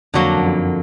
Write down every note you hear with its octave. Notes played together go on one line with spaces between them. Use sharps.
F2 D3 F#3 A#3
F#2
F2